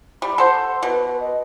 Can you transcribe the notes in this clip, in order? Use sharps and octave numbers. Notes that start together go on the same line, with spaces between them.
G3 B5
A4 C5 F#5
B2 B4
D#5